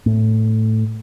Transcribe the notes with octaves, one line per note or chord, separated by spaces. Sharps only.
A2